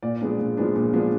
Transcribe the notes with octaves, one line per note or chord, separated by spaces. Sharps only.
A#2 D5
F3 G#3 B3 D4
A#2
F3 G#3 B3 D4
A#2
F3 G#3 B3 D4